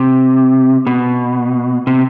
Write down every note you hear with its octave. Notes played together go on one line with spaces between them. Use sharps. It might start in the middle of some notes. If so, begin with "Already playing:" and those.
Already playing: C3
B2
C3